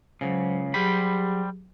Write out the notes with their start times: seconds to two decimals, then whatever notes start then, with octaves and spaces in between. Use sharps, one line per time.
0.21 C#2 C#3 F#3 C5
0.74 F#3 G3 G4 G#4 C5 B5